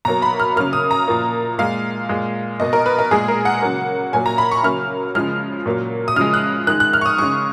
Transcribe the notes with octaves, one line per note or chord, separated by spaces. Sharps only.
B2 F#3 A#3 A#5
B5
F6
C#3 F#3 A#3 F6
D#6
A#5
A#2 F3 A#3
A#2 G#3 F5
A#2 G#3
B2 A#3 D#5
A#4
B4
A#4
A#2 G#3 G#4
A#4
F#5
C#3 F#3 A#3
A#2 F#3 A#3 G#5
A#5
B5
C#6
C#3 F#3 A#3 F6
C#3 F3 G#3 F6
A#2 F#3 A#3
D#6
C#3 F3 G#3 F6
F#6
D#3 G#3 F#6
F#6
F6
C#6
D#6
C#3 G#3 C#6